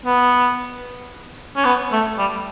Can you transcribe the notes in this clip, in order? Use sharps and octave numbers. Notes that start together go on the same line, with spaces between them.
B3
C#4
B3
A3
G3